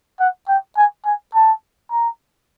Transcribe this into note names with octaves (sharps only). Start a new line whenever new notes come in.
F#5
G5
G#5
G#5
A5
A#5